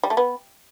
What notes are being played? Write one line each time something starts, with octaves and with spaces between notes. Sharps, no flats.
G3
A3
B3